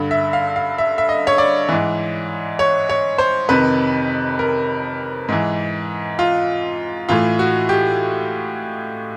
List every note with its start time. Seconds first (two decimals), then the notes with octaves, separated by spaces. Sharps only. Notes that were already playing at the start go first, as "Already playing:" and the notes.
Already playing: G2 D3
0.11 E5
0.33 F5
0.56 F5
0.78 E5
0.98 E5
1.09 D#5
1.27 C#5
1.38 D5
1.69 G#2 E3
2.59 C#5
2.89 C#5
3.18 C5
3.49 F2 C3 D#3 B4
4.39 A#4
5.29 G#2 E3
6.19 F4
7.09 A2 E3 F4
7.39 F#4
7.69 G4